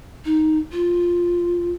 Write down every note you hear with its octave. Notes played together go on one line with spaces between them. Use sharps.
D#4
F4